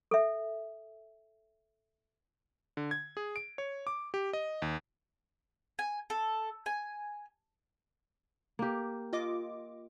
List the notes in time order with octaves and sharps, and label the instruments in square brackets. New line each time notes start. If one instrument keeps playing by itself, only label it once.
[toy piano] A4 E5
[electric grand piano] D3
G#6
G#4
D7
C#5
D6
G4
D#5
D#2
[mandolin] G#5
A4
G#5
[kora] A#3 G4
[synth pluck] F4 D#5 D6